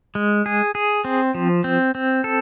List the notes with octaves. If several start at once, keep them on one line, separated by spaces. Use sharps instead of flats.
G#3
G#4
G#4
C4
F3
C4
C4
A4